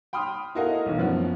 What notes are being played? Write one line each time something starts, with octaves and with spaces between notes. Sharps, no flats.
G5 B5 C6 D#6 F6
E4 F#4 A4 A#4 D#5 F5
B1 E3
F#2 F3 B3